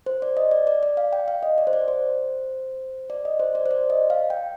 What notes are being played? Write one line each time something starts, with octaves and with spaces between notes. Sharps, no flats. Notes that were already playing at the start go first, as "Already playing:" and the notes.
C5
D5
D#5
D5
D5
D5
F5
G5
F5
D#5
D5
C5
D5
C5
D5
D#5
C5
D5
C5
D5
D#5
F5
G5